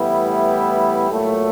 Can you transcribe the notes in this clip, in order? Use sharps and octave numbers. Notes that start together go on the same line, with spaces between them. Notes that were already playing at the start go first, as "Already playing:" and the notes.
Already playing: A2 E3 G3 B3 E4
A#2 F#3 A3